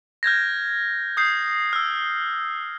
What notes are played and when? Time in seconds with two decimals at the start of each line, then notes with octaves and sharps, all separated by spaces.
0.23 F6 G6 G#6 A#6
1.17 D#6 G6 C7
1.73 E6 F6